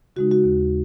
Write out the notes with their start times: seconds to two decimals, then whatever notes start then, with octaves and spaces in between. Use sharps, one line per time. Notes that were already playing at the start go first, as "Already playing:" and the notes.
0.16 C#3 G#3 D#4 F#4
0.31 F#4
0.44 D#2